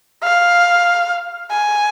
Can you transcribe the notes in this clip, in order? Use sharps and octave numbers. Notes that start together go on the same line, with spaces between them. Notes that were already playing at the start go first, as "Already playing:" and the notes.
F5
G#5